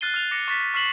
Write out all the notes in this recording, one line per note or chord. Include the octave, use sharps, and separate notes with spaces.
F6 F#6 A6 C7 D#7 G7
F6 F#6 F7
D6 A#6 C#7
C#6 F#6 A6 B6
C#6 F6 B6 C7 E7 F#7